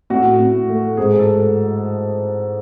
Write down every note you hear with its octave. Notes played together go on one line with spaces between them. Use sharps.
A2 F#4
A2
A3
G#2 G#4
A4